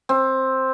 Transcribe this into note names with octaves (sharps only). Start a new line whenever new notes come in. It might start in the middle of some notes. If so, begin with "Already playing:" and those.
C4